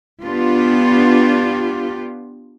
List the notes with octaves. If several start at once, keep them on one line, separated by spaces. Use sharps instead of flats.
B3 D4 F4 G4